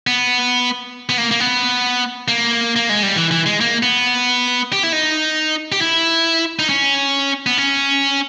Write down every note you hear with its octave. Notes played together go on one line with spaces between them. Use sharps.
B3
B3
A#3
A#3
B3
A#3
A#3
G#3
G3
E3
E3
G#3
A#3
B3
G4
E4
D#4
G4
E4
D#4
C#4
B3
C#4